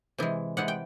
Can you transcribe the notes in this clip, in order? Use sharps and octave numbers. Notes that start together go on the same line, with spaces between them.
C3 E3 G#3
C3 E3 G#3 F#5
G5